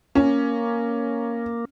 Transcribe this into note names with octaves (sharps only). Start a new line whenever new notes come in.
A#3 C#4